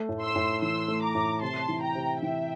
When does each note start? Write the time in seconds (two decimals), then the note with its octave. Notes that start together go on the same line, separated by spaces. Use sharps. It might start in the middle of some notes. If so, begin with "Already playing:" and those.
Already playing: A3
0.09 A2
0.22 C6 E6
0.36 A2
0.62 E3 C6 E6
0.88 A3
1.03 A#5 D6
1.15 A2
1.42 C3 A5 C6
1.68 E3
1.82 G5 A#5
1.95 C3
2.22 E3 E5 G5